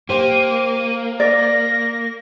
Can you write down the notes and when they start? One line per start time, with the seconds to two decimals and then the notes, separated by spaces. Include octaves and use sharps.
0.09 A#3 G4 C5 G5 D#7
1.20 D5 A#6